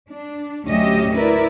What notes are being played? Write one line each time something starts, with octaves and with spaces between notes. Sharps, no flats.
D4
D2 F#3 C#4 G4 D#5 E5
E4 A#4 B4 D5